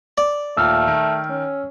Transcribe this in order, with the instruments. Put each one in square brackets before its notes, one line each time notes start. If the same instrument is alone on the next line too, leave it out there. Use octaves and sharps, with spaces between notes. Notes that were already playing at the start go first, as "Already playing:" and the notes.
[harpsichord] D5
[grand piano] D#2 A#2 [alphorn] A3 [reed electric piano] E6 F6
[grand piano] D#3
[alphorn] C#4